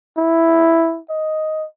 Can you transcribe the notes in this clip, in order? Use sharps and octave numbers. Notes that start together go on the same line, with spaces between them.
E4
D#5